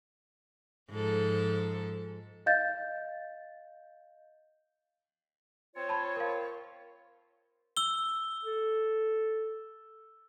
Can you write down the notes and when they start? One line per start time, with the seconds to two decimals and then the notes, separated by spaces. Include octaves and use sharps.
0.90 G#2 F3 A4
2.46 D#5 F5 G6 A6
5.75 C4 F4 C#5
5.89 A5 B5 G#6
6.16 A#4 F5
7.77 E6 G7
8.44 A4